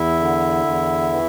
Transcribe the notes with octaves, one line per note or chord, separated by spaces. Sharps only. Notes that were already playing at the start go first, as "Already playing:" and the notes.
Already playing: E2 E4 E5
D3
E2
E3